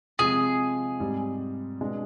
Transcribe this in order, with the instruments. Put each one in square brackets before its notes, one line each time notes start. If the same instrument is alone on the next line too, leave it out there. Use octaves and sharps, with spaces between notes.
[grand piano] C3 F3 G#3 C4 [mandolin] G#4
[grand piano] G#2 G3 C4
B2 G#3 D4